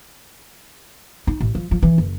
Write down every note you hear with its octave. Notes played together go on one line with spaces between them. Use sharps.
D#4
A1
F3
F3
E3
F#1